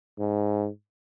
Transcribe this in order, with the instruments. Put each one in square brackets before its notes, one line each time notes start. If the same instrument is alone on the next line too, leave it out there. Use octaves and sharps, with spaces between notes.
[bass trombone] G#2